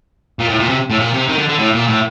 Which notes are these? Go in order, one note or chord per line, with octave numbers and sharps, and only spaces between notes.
A#2
A2
A#2
C3
A2
A#2
C3
D#3
D3
D3
A2
A#2
A2